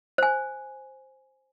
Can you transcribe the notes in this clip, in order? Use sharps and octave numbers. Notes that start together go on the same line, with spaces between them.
C5 G#5